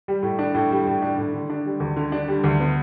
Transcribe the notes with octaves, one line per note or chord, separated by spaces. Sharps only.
G3
A2
D4
A2
G3
A2
D4
A2
D3
D4
G3
D2
D3
D4
G3
D2
B3